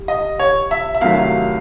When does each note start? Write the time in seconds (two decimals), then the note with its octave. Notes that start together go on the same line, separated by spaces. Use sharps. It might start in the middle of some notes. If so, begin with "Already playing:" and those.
Already playing: G3
0.08 D#5
0.39 C#5
0.71 E5
0.94 E5
1.01 C2 C3 D#3 F#3 A3 F5